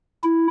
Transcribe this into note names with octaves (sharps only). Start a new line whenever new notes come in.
E4